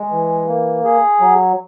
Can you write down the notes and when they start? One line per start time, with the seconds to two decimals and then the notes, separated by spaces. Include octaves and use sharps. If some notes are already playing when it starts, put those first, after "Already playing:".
Already playing: G#3
0.11 E3
0.48 A#3
0.85 G#4
1.20 F#3